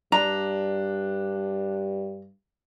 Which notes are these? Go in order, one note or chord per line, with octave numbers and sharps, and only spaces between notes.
G2 D4 A#5